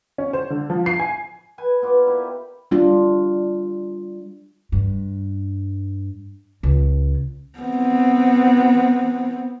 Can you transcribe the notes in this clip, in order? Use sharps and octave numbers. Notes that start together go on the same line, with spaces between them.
C#4
C5
D3
F3
C7
G#5
B4 G#5
B3 F4 D5 A#5
E4 G4 A#4
G3 D4 F4
G2
C#2
B3 C4